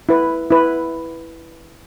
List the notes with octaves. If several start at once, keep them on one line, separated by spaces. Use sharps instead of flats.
E4 B4
E4 B4